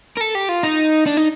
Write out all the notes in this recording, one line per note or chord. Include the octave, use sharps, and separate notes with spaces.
A#4
A4
G4
F4
D#4
D4
D#4